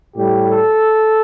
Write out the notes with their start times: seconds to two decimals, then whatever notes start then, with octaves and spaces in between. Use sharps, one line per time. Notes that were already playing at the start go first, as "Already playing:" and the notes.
0.16 A2 G3 G4
0.48 A4